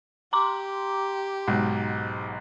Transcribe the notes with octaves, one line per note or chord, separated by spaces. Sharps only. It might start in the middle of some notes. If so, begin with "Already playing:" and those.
G4 A#5 C6 D6
B1 G#2